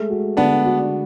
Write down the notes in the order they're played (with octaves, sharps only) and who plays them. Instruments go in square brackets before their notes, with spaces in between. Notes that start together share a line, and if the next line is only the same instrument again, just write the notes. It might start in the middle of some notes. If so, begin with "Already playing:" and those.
Already playing: [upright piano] G#3 A3
F#4
[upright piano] D3 [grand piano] B3 D4
[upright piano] F#4